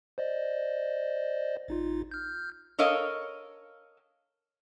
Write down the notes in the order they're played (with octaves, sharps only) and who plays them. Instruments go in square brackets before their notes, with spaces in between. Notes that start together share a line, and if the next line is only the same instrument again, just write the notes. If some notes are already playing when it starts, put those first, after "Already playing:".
[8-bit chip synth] C5 D5 D#5
A1 D#4 F4
F6 G6
[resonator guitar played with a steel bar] A4 A#4 C#5 D#5 F5